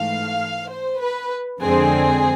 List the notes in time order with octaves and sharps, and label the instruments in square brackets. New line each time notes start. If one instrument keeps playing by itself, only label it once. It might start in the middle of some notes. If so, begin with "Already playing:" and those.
Already playing: [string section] G#2 E3 A3 F5
C5
B4
F2 D3 G#3 C4 G#4